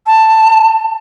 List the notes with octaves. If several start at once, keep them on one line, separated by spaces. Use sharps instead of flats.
A5